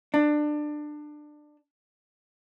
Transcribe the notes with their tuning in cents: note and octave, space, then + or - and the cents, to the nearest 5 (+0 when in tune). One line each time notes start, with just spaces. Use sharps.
D4 +20